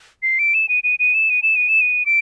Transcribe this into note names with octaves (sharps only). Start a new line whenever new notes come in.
C7
D7
E7
D#7
D#7
D#7
E7
D#7
E7
D#7
E7
D#7
D7